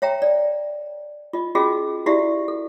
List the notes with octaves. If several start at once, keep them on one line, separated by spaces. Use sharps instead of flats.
C#5 E5 G5 A#5
D5
F4 D#5
C#4 F4 F#4 G#4 D#5
E4 F#4 G4 D5 E5
A4